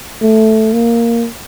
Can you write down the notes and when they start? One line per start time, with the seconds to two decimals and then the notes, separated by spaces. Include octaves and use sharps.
0.22 A3
0.73 A#3